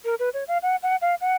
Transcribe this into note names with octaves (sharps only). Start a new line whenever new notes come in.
A#4
B4
C#5
F5
F#5
F#5
F5
F#5